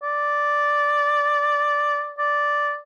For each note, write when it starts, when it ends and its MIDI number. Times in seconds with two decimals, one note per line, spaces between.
0.03 2.12 74
2.19 2.77 74